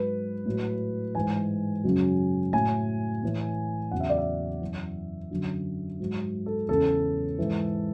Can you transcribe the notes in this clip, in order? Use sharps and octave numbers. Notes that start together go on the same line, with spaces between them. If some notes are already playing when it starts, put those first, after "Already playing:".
Already playing: G#2 F#3 B4
A2 F#3
G#2 E3 G#5
F#2 C#3 F#3
A2 F#3 G#5
A2 E3
E2 C#3 F#3 F#5
E5
D5
E5
F#2 E3
F#2 D3 F#3
G#2 F#3
A4
E2 C#3 E3 A4
G#2 E3